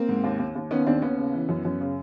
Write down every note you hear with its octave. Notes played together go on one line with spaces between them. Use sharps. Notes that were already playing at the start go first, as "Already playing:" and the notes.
Already playing: A#3 C4
G#2
D#2
D#2
D#2
D#3 B3 C#4
D#2 C4 D4
D#2 B3 C#4
C#3
E3
F#2
F#2
C#3